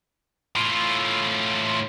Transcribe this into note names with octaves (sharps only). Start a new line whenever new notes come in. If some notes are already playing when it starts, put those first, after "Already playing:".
A2 F4